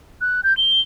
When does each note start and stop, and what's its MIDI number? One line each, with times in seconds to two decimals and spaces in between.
0.21 0.41 90
0.44 0.56 91
0.57 0.81 103